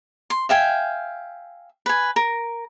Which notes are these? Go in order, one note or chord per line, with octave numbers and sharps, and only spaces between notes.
C6
E5 F5 G5 G#5
B4 G#5
A#4